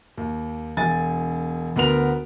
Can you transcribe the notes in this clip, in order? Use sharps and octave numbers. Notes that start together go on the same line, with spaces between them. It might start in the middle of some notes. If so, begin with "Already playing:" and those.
D#2
E1 G#5 A6
D2 B3 A#4 F7